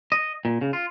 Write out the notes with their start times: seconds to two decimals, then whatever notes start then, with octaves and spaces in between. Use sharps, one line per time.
0.12 D#5
0.45 A#2
0.61 C#3
0.73 F4